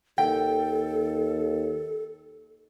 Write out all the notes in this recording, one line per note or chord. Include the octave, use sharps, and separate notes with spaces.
D#2 A4 G5